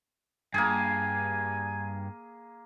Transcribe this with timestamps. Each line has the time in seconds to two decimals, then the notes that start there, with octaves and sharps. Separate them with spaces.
0.54 G2 A#3 G#4 G#5